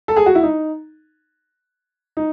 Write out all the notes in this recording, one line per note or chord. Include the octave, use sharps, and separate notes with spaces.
A4
G#4
F#4
E4
D#4
D#4